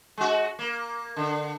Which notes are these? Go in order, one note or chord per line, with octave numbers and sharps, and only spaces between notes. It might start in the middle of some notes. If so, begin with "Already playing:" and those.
G#3 F#4
A#3
D3